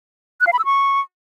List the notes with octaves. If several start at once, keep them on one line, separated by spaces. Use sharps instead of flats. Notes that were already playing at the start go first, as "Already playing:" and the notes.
F#6
F5
B5
E6
C#6